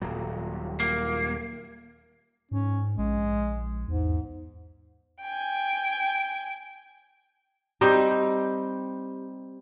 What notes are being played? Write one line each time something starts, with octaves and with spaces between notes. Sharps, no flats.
D#1 A#2 F#3
A#3
G#2 C#4
A#1 G#3
E2 G#2
G5 G#5
G3 C4 D#4 G4